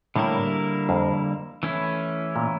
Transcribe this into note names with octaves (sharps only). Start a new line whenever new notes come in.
A2 D3 G3 A#3 E4 A#4
F2
E3 A3 C#4 E4
A#2